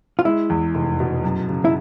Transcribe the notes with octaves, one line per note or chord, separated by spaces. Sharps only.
F4
G#3 E4
E2
F1
B2
F#2
C#3
E4